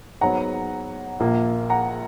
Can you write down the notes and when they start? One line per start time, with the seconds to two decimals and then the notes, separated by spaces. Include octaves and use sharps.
0.21 G#2 F#3 B3 F#5 A#5
1.20 A#1 A#2 A#3
1.70 F#5 A#5